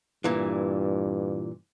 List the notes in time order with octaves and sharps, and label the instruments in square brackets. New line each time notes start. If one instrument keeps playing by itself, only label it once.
[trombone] G2 [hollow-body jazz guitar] A#2 E3